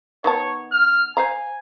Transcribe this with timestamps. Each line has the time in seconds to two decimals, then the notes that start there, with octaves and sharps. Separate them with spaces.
0.24 D#3 B3 C#5 A5
0.72 F6
1.17 C5 F5 G#5 A#5